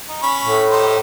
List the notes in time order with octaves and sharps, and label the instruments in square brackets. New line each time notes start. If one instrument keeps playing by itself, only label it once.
[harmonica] D#4
C#4 B5 C#6
[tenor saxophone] A2
[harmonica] D#4 G4 C5